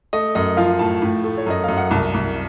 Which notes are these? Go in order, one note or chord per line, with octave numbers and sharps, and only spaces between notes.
A3 D#5
F#2 D#5
F3 F5
A2 A5
A2
A3
C#5
F#2 D#5
F#2 F5
F#5
C2 A5
C2